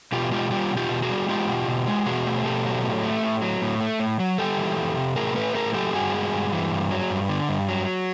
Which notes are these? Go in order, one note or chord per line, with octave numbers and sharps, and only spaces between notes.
B2 F4 G4
G#3 F4 G4
G3 F4 G4
B2
F4 G4
B2
F#4 G#4
G3
G#3 F4 G4
B2
B2
G#3
B2 F#4 G#4
A3
B2 G4 A4
F#3
A2
A3
A2
F#3
A2
A3
A2
F#3
G3 G4 A4
E3
F2
C3
A2 G#4 A#4
A3 A4 B4
A2 G#4 A#4
F#3 G4 A4
G2 F#4 G#4
G#3
G2
E3
G2
F#3
G2
D3
G2
F#3